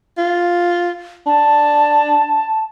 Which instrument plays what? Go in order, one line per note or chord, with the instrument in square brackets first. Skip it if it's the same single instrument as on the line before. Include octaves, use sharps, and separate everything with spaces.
[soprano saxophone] F4
[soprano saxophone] D4 [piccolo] A5